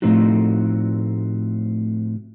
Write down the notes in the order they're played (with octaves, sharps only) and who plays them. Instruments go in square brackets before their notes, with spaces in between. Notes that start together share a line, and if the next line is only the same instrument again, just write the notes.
[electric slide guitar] A2 F3 A3 C4 D#4 F#4